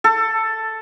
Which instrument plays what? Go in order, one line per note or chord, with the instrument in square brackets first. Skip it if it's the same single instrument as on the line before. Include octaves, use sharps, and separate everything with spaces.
[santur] A4